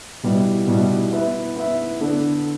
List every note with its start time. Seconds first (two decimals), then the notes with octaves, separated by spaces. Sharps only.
0.23 B2 G3 B3 E4
0.67 B2 G3 B3 E4
1.11 B3 E4 B4 E5
1.56 B3 E4 B4 E5
2.00 D3 B3 D4 A4